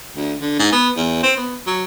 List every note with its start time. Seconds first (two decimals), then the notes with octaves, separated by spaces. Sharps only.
0.16 D2
0.41 D3
0.59 G#2
0.72 B3
0.96 E2
1.23 C4
1.37 B3
1.67 F#3